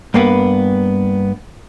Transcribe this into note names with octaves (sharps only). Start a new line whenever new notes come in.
G2 A#3 B3 B4